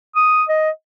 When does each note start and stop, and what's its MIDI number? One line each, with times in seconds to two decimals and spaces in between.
0.16 0.44 87
0.49 0.70 75